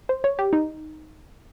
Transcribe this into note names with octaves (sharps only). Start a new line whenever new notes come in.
C5
C#5
G4
D#4